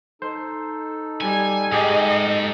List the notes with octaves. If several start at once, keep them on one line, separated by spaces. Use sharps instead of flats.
D#4 A4 C5
G3 G#5
G#2 G4 G#4 D#5